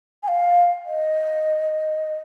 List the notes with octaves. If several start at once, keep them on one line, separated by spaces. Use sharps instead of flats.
G#5
F5
D#5